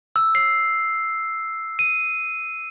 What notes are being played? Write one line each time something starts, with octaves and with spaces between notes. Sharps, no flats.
E6
C7
D#7